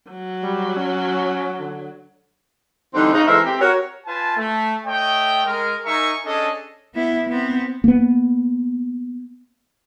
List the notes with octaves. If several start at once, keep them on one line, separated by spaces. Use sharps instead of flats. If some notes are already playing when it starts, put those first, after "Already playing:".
F#3
G3
C#4
D3
D3 E3 G3 C4 D4 D#4
C#3 D#4
E3 G#3 A4 A#4 C5 E5
C4 G4
F#4 A#4 C#5
F4 B4 G#5 A5
A3
A3 C#5 D#5 G5
G#3 A#4
D#4 A#4 E5 G#5 A#5 C#6
C#4 D4 G#4 A4 D#5
B3 E4
B3 C4
A#3 B3